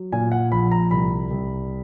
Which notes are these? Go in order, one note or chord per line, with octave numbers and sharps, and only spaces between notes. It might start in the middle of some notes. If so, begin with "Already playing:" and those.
Already playing: F#3
A#2 G#5
F#5
A#1 B5
A#5
C2 B5
C2